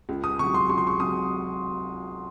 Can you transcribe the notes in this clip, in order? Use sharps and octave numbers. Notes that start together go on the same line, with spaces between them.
C#2
D#6
C3 F#3 C#6
C6
C#2 C#6
C6
C#6
C3 F#3 D#6